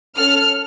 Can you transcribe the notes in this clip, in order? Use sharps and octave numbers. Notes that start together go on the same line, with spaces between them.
C#4 A4 F6